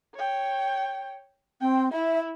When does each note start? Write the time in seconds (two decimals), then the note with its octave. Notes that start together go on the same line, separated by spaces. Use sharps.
0.15 C#5 G5
1.61 C4 G5
1.92 E4 E5